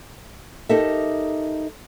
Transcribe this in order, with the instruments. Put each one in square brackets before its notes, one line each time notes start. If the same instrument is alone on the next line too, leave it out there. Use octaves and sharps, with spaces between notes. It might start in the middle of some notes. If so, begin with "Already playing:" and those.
[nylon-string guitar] D#4 G4 A4 A#4 E5